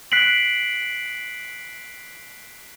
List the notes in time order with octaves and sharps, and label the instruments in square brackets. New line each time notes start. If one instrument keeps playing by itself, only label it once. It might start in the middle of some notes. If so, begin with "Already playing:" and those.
[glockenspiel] F#6 B6 C7 D7 F#7